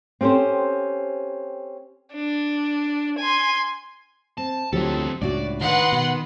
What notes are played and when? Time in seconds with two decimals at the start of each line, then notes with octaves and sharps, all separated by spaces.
0.21 C4 C#4 G4 A4 C5
2.13 D4
3.18 G#5 C6
4.38 C4 A5
4.73 D2 F3 F#3 C4 G4 A4
5.22 C#2 A2 D4 F#4 D5
5.62 D#3 B4 F#5 C6
5.92 B2 D#4